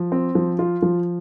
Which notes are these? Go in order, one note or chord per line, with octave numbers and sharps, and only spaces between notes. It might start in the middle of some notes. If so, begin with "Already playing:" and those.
Already playing: F3
C4
F3
F4
F3